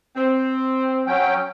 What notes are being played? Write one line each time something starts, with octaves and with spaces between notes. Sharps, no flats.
C4
F#3 C#4 G5